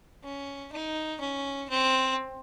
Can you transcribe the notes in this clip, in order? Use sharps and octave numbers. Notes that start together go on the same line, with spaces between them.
C#4
D#4
C#4
C4